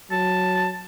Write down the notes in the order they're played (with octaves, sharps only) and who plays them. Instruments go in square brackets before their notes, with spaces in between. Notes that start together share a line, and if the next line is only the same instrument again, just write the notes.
[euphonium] F#3 [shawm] A5